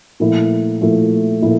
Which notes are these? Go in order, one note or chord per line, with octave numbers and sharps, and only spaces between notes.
A#2 F3 A3 E4
A#2 F3 A3 E4
A#2 F3 A3 E4